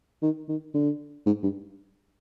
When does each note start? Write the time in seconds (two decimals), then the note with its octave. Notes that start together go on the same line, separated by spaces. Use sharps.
0.22 D#3
0.48 D#3
0.74 D3
1.26 G#2
1.43 G2